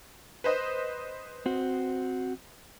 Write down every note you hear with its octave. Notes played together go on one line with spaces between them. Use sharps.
B4 C5 D#5
C4 F#4